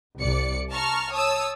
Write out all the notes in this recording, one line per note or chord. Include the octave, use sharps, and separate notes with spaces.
C2 D5 C#7
A5 A#5 C#6 F6
C#5 A5 D#6 E6